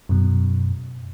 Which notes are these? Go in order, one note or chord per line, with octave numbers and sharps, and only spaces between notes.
F#2 B2